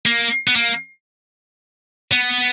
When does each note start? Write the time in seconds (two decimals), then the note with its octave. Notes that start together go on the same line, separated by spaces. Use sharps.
0.06 A#3
0.48 B3
0.56 A#3
2.12 B3